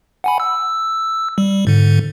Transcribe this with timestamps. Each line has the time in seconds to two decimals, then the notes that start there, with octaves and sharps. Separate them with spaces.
0.24 F#5 G#5 B5
0.40 E6
1.38 G3
1.67 G#2 D3